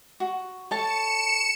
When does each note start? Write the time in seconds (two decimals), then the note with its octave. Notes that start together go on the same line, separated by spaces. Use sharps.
0.20 F#4
0.71 A4 C#5 A5 C#7 E7